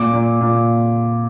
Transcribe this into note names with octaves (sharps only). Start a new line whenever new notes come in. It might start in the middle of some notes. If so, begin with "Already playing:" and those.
Already playing: A#2 D6
A#2
A#2